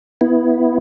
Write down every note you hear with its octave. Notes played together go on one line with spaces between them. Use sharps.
B3 E4